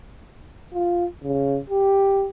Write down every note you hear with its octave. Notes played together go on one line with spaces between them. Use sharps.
F4
C#3
G4